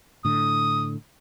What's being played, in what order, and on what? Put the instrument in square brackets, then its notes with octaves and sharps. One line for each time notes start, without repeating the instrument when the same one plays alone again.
[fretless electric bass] A2 D3 [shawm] D#6